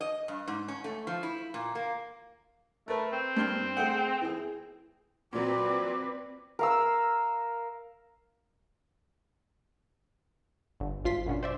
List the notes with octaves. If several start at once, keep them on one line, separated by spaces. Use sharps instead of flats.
D#5
G2
G#2
C#4
A3
F3
E4
A#2
A#3
A3 A#4 B4
C4
G2 C6 F6
A3 G#4 F#5
E3 G#4
A#2 F#3 C4 B4 D5 D6
A#4 F5 E6
G1
G#1 F4 C6 B6
F#2 B2 C#4 D4
C5 D5 E5